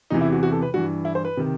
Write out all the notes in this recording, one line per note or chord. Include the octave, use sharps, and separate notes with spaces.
E2 C3 E3 D#4
E4
F#4
F#4
A4
B4
G2 E3 F#4
E4
C5
B4
C3 D#3